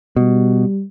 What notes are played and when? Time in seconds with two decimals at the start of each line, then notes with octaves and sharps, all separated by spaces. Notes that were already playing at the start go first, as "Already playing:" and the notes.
0.16 B2 G3